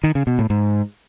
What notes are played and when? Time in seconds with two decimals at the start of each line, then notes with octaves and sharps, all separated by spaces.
0.04 D#3
0.15 C#3
0.27 B2
0.39 A2
0.50 G#2